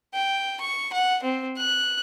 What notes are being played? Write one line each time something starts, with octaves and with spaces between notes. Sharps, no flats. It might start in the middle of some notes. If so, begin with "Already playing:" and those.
G5
C#6
F#5
C4
F#6